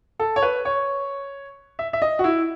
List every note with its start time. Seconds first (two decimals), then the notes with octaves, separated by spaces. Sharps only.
0.20 A4
0.36 C#5
0.42 B4
0.65 C#5
1.79 E5
1.93 E5
2.02 D#5
2.19 F#4
2.24 E4